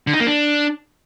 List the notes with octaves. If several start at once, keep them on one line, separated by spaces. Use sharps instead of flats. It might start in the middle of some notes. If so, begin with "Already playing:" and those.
D3
D#4
A#3
D4